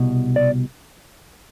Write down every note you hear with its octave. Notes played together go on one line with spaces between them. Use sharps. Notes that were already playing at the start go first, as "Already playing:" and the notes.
Already playing: C2 B2
D5